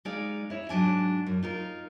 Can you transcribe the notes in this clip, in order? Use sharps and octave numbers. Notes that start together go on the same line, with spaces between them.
G#3 D#4 D5 F5
E4 C#5
G#2 F#3 D4 G#5
F#2
D#4 F4 A#4